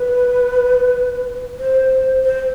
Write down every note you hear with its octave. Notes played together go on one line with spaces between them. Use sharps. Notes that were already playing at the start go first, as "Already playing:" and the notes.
Already playing: B4
C5
C5